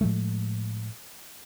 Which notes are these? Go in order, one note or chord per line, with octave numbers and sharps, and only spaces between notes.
A2 F3 G#3 A3